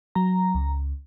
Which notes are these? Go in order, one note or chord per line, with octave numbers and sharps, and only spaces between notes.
F#3 A#5
C#2